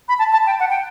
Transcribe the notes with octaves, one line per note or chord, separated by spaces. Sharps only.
B5
A5
A5
G5
F#5
G5